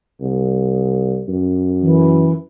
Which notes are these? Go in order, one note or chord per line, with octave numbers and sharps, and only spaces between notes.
C2
F#2
E3